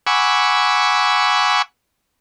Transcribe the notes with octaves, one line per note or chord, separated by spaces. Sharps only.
F#5 G#5 B5 C#6 D6 E6